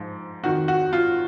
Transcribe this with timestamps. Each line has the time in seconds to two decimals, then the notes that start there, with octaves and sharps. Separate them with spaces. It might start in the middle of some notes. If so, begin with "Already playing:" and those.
Already playing: G#2 F3
0.43 F2 D#3 F#4
0.68 F#4
0.93 F4